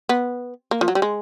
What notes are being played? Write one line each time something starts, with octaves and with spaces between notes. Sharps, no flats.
B3
A#3
F3
F#3
G3
G#3